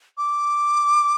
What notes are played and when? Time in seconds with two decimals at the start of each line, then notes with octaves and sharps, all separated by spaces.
0.18 D6